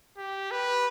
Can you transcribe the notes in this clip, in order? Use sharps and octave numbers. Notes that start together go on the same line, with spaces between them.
G4
B4